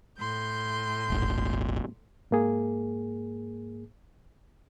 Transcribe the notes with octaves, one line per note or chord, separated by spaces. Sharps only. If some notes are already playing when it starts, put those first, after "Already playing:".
A2 C6 G6
D#1 G#1
G#2 A#3 G#4